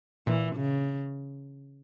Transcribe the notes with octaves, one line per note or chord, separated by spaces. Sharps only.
A#2 E3
C#3